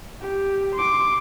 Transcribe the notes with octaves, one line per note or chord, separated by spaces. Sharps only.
G4
C6 D6